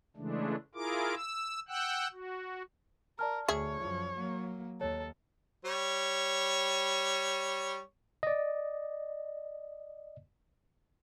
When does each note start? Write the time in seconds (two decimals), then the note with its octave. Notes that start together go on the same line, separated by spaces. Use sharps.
0.17 C#3 E3 G#3 A3 D4
0.75 E4 F4 G#4 A#4 D6
1.15 E6
1.68 F#5 G5 E6 F#6
2.12 F#4
3.19 A#4 D5 A5 F6
3.48 D2 G#4 C#5 E5
3.81 F#2 F3
4.15 F#3 A#3
4.81 D#2 A4 C#5
5.65 G3 C#5
8.23 D5 D#5